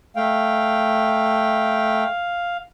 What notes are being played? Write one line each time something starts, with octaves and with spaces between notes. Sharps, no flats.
A3 F5 G5